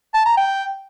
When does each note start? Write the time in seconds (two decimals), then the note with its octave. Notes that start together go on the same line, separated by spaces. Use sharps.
0.14 A5
0.26 A#5
0.38 G5